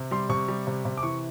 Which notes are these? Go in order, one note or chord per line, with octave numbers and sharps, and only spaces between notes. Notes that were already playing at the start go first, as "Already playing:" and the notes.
Already playing: C3
G3 C6
C3 C#6
G3
C3
C3
D6
E3 C#6